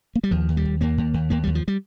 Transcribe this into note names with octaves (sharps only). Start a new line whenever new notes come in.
A#3
G3
D#2 F3
D#2
G3
D#2
D#2 A#3
D#2
D#2
D#2 A#3
D#2 G3
F3
G3